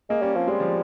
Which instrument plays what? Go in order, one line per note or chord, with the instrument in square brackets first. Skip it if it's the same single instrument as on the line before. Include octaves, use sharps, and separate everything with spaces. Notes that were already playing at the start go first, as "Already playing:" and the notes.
[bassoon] G#3 [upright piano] A#3
[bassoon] G3 [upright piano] C#4
[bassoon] F3 [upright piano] C4
[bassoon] G3 [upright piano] G#3
[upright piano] F3